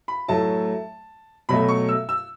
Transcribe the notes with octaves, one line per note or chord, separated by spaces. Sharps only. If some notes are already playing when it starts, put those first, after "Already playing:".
B5
A2 F#3 A3 A5
B2 F#3 A3 B5
C#6
E6
E6